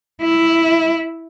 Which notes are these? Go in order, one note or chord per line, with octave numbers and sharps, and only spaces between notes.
E4